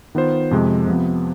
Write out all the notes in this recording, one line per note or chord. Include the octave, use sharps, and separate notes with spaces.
D#3 B3 F4 C5
F2 C3 F3 G#3
C3 F3 B3